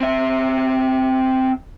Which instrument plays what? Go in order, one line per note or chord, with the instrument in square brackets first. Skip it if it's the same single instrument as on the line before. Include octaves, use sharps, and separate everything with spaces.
[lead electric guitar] C4 E5